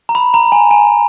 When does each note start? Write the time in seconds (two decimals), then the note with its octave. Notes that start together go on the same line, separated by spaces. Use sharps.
0.09 A#5
0.15 B5
0.34 A#5
0.52 G#5
0.71 G#5